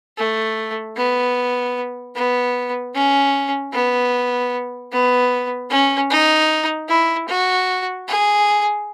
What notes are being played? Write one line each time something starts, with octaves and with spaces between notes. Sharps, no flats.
A3
B3
B3
C#4
B3
B3
C#4
D#4
E4
F#4
G#4